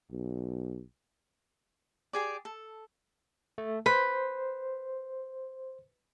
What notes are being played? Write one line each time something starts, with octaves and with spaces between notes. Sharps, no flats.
B1
G4 G#4 D5
A4
A3
B4 C5